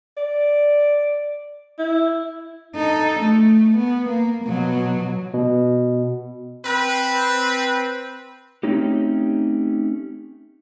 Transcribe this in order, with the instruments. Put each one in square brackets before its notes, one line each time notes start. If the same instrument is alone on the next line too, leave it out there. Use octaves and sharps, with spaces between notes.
[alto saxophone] D5
E4
[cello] D#4 A4
A3
B3
A#3
B2 F#3
[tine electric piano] B2
[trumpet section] C4 B4
[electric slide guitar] A3 C4 C#4 D#4 G4